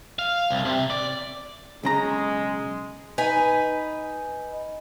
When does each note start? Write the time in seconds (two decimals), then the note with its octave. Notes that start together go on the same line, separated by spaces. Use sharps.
0.19 F5
0.50 C2
0.65 C3
0.90 D5
1.83 B1 C#3 G#3 A#5
3.18 D#4 B4 G#5